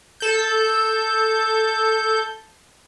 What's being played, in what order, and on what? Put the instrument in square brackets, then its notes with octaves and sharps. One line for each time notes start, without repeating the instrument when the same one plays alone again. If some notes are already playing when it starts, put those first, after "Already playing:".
[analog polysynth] A4 G6